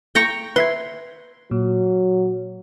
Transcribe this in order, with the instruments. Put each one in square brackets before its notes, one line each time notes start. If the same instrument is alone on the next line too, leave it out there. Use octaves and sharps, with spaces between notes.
[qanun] G5 A#5 C#6
[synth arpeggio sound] B4 E5 G#6 [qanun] C6
[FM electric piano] A#2 [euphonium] F#3